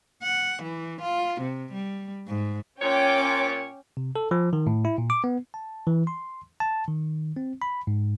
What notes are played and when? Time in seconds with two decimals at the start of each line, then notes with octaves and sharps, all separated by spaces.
0.23 F#5
0.63 E3
1.01 F4
1.41 C3
1.72 G3
2.28 G#2
2.82 A#2 C#4 C#5 G5 D6
3.97 C3
4.16 A4
4.31 F3
4.53 D#3
4.67 A2
4.85 E4
4.98 A#2
5.10 D6
5.24 B3
5.54 A5
5.87 E3
6.07 C6
6.60 A5
6.88 D#3
7.37 C4
7.62 B5
7.87 G#2